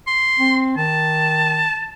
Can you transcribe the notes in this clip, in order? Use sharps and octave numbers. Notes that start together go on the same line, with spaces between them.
C6
C4
D#3 A5